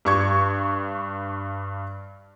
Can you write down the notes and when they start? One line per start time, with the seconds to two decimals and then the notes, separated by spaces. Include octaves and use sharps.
0.05 G2 C#6 G#6